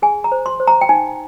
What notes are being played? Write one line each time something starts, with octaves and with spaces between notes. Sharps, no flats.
G#4 G#5
A#5
C5
C6
C5
A#5
G5
D#4 G#5